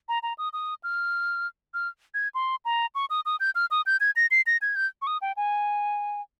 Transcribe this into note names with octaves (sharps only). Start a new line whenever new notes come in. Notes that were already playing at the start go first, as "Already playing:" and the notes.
A#5
A#5
D#6
D#6
F6
F6
G#6
C6
A#5
C#6
D#6
D#6
G6
F6
D#6
G6
G#6
A#6
C7
A#6
G#6
G6
C#6
D#6
G5
G#5